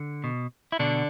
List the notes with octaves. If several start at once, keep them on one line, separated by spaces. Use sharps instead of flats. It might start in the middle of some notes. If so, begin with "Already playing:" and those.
Already playing: D3
B2
E4
B2 D3 D4